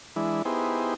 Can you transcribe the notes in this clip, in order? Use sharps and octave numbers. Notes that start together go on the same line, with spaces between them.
E3 G#3 D4 E4
B3 D#4 E4 G4 G#4 C5